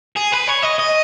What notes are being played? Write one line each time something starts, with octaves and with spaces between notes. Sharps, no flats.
G#4
B4
C#5
D#5
D#5